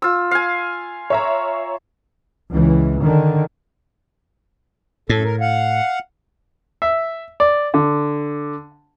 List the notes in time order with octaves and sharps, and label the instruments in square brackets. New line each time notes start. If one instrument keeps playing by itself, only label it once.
[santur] F4 E6
F5 G#5
[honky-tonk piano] C#5 E5 A#5
[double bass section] C#2 E3
D3 D#3
[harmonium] F#2 A4 [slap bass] A2
[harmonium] A#4
F5 F#5
[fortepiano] E5
D5
D3